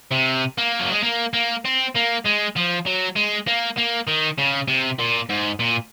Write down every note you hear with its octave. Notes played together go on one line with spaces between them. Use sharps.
C3
A#3
F#3
G#3
A#3
A#3
C4
A#3
G#3
F3
F#3
G#3
A#3
A#3
D#3
C#3
C3
A#2
G#2
A#2